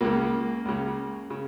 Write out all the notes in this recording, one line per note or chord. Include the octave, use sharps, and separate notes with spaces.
C#2 C#3 A#3
C#2 C#3
C#3